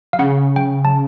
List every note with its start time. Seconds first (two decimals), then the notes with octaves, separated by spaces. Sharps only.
0.13 F5
0.19 C#3 F#5
0.56 G5
0.85 A5